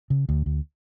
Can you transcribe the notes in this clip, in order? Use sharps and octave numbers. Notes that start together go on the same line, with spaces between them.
C#3
D2
D2